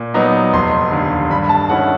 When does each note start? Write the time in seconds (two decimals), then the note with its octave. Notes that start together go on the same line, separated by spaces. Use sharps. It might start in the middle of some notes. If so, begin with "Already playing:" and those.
Already playing: A#2
0.14 F#3 B3 D#4
0.53 F1 C6
0.91 D#2 D3
1.30 G2 B5
1.49 A5
1.69 D#3 G#3 C#4 E4 F#5